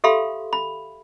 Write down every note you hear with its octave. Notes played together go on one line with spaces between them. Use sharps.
G4 A4 E5 F5 B5 C6
B5